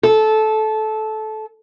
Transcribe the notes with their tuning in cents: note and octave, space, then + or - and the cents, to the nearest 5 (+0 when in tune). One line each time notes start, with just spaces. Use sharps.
A4 -15